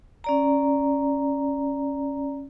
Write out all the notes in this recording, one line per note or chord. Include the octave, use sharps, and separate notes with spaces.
C#4 D5 A#5